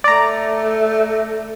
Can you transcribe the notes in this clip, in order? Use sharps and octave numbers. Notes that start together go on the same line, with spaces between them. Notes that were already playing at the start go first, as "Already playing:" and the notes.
A3 D5 A#5